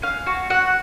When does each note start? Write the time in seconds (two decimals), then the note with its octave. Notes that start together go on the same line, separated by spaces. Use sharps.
0.02 C#4 F5
0.27 F#4
0.50 F#4 F#5